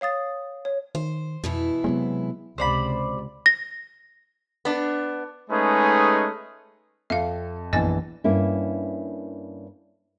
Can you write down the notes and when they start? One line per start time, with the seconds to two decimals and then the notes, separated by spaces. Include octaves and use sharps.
0.01 C#5 F5 D#6 A6
0.65 C#5
0.95 D#3 C5
1.44 F2 B2 E3 E4
1.84 C3 F#3 G#3 B3
2.58 C#2 C3 C5 D5 B5
3.46 A#6
4.65 B3 D4
5.49 G#3 A3 C#4 D#4 G#4 B4
7.10 F2 E5 F5
7.73 A#1 F#2 E3 A#3 B3 D#5 G#5 A6
8.24 G2 A#3 C#4 E4